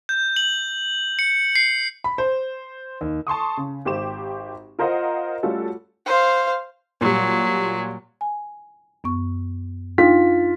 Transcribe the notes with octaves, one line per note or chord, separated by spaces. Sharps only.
G6
F#7
C#7
C7
B5
C5
D#2
A5 C6 C#6 D#6
C#3
G#1 G4 C5 D6 E7
F4 A#4 C5 D#5 F5 F#5
G3 A3 C#4 F4 F#4 A4
C5 F5
A#2 F#3 G3
G#5
F#2 B3 C#6
D4 D#4 F4 G5 B6